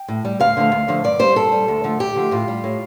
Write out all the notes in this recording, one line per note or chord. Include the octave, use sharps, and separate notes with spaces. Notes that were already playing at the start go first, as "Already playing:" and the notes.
Already playing: G5
A2
G3
D2 F5
D3 F3 A3
D2
D3 F3 A3
G2 D5
G3 C5
G2 A4
G3
D2
D3 F3 A3
D2 G4
D3 F3 A3
A2 F4
G3
A2